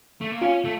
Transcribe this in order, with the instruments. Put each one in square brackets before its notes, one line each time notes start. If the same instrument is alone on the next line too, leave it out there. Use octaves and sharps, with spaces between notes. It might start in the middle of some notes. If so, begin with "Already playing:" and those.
[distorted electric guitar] A3
A#3
[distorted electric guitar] C#4 [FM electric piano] F4
[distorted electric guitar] A3